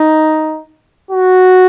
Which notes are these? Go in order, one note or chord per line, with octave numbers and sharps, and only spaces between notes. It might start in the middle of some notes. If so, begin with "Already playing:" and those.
Already playing: D#4
F#4